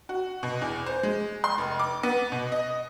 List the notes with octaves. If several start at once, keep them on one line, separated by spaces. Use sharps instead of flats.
F#4
B2
E2
C5
G#3
C6
F1
D6
B3
B2
D#5